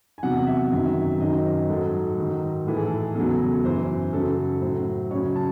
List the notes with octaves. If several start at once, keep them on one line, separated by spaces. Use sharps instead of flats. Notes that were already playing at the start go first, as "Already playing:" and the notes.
G#5
E2 C3 F#3 F#5
E5
F#2 D#3 F#3
F#2 D#3 F#3 D#5
C5
G#2 F#3 A4
G#2 D#3 F#3
A2 E3 A4
G#4
A4
E2 C#3 F#3 A4
F#2 E3 C5
F#2 C#3 F#3 A4
A4
A2 F#3 C5
F#2 C#3 F#3 C#5
A5